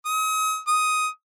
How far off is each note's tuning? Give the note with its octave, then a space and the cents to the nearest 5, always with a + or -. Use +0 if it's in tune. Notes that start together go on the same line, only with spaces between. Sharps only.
D#6 +40
D#6 +10